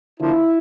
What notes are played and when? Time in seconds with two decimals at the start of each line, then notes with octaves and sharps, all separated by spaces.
0.20 D3 F3 A#3 E4